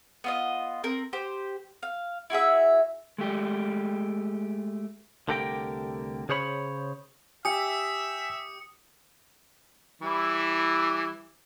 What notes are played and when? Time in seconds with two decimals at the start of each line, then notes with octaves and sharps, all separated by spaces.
0.24 B3 F4 D#5
0.84 C4 A#4
1.13 G4 C5
1.83 F5
2.30 E4 F#4 G#4 E5
3.18 G#3 A3 G4
5.28 C2 D3 A3 G4 A#4 G5
6.29 C#3 G#4 C5 C#5 B5
7.45 G4 E5 G#5 D#6 C#7
10.02 E3 G3 E4